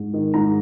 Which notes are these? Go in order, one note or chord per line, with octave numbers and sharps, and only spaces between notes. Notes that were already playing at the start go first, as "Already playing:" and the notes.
Already playing: G#2
D#3
G#2 A#5